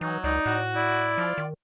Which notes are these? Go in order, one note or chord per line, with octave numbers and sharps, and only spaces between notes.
E3 F#3 D#4
C#2 D#4 D5
A2 F#4
E4 D5
F3 F4
D#3